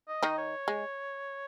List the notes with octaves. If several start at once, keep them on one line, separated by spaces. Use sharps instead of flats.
D#5
D#3 D#4
C#5
G#3